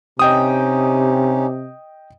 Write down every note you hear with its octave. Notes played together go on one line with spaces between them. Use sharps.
C3 C#4 D#4 G4 D#5 G5 D#6